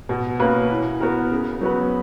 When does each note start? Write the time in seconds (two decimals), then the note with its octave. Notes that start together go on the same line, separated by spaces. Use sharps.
0.09 B2
0.39 A#3 C#4 F#4 B4
0.70 E3
1.01 B3 F#4 A#4
1.31 C#3
1.61 F#3 B3 F#4 B4